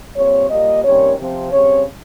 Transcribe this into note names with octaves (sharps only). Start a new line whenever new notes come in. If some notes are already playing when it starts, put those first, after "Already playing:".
A#2 G3 C4 C#5
A#2 G3 A#3 D#5
C3 D#3 G3 A#3 C#4 C#5
C3 F3 C4
C#3 G3 C4 C#5